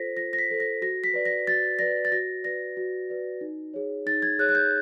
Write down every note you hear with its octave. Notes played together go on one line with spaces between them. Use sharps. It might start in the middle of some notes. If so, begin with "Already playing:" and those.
Already playing: F4 A4 C5 A#6 B6
F4 A#6
A#6
B6
A4 C5
A#6
F#4 A#6
B6
B4 D5
A#6
F#4 A6
B4 D5 A#6
A6
F#4 A#6
B4 D5 A#6
F#4
B4 D5
D#4
G#4 C#5
D#4 A6
G#6
G#4 C#5 F#6
F#6
G6